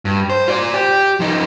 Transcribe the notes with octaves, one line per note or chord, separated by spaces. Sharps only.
G2
C5
F4 D5
G4
F3 D#4